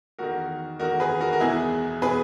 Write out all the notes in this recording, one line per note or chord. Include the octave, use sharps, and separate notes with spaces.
E2 D#3 F#4 A#4
E2 D#3 F#4 A#4
G#4 B4
F#4 A#4
A#4
E2 B2 E4 G#4
B2 G#4 B4